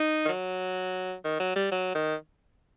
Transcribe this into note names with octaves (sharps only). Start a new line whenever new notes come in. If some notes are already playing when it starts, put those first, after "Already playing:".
Already playing: D#4
D#3
F#3
D#3
F#3
G3
F#3
D#3